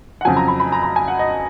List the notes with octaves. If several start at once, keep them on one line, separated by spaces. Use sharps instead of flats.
F#5
F2 C#3 F#3 G#5
A#5
B5
B5
A#5
A#5
G#5
F#5
D#5